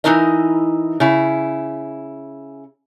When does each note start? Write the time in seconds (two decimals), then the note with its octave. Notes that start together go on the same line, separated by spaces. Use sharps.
0.04 E3 C4 D#4 E4 A#4 D#5
1.00 C#3 E4